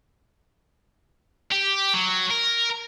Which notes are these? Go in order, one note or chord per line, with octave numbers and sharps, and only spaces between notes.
G4
F#3
A#4